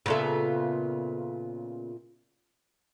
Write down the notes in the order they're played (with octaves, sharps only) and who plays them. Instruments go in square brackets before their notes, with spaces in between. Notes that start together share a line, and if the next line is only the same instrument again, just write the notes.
[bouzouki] A#2 F4 E5 [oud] C#3 B3 A4